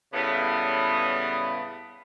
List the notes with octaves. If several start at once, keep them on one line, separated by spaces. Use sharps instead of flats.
A2 C#3 G3 B3